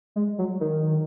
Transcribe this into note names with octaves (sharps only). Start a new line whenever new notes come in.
G#3
F#3
D#3